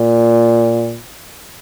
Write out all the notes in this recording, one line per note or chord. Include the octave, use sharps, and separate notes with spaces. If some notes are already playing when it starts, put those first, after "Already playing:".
Already playing: A#2